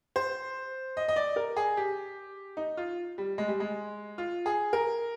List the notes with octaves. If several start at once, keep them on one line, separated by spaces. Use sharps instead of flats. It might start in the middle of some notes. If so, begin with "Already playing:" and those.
C5
D#5
D#5
D5
A#4
G#4
G4
D#4
F4
G3
G#3
G3
G#3
F4
G#4
A#4